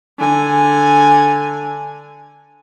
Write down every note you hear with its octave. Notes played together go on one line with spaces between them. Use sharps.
D3 G#5